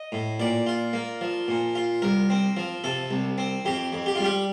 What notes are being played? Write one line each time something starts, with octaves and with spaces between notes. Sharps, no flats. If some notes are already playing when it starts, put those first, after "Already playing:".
Already playing: D#5
A2
A#2 D5
F4
A#3
F3
A#2
F4
C2 A#4
C4
F3
C3 A4
C2
C4
F2 G4
F2
G4
F4
G3 G4